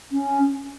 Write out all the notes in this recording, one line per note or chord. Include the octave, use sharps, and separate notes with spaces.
C#4